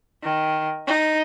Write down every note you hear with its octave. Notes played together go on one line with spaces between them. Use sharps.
D#3
D#4